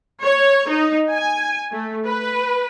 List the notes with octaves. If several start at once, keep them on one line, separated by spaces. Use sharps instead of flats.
C#5
D#4
G#5
A3
B4